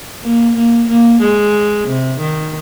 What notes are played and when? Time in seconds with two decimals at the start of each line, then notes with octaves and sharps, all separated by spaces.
0.22 A#3
0.56 A#3
0.88 A#3
1.21 G#3
1.87 C3
2.20 D#3